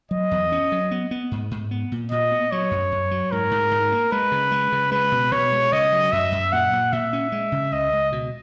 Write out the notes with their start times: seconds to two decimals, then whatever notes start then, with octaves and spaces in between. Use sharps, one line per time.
0.11 F#3 D#5
0.31 E2
0.52 C#4
0.72 F#3
0.91 B3
1.11 B3
1.31 G#2
1.51 G#2
1.71 B3
1.92 A#2
2.11 A#2 D#5
2.32 B3
2.52 F#3 C#5
2.71 F#2
2.92 F#2
3.11 F#3
3.32 G#2 A#4
3.51 G#2
3.71 G#2
3.92 A#3
4.12 G#3 B4
4.32 C#3
4.51 G#3
4.72 C#3
4.92 G#3 B4
5.12 B2
5.32 B2 C#5
5.52 G#3
5.72 C#3 D#5
5.92 F#3
6.12 F#2 E5
6.32 F#2
6.52 A#2 F#5
6.72 A#2
6.92 A#2 E5
7.13 C#4
7.32 G#3
7.52 C#3
7.72 C#2 D#5
7.93 C#2
8.12 B2